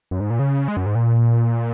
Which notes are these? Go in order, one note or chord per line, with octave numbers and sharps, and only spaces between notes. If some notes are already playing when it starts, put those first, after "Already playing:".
F#2
G#2
A#2
C#3
G#3
F#2
G#2
A#2